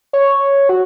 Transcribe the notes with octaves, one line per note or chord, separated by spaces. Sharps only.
C#5
F#4